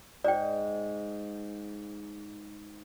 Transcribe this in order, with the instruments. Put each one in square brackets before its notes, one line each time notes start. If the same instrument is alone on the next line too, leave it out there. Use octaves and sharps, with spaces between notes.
[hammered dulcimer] G#2 [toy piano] D5 G5